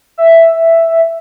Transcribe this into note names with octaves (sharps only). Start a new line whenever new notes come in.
E5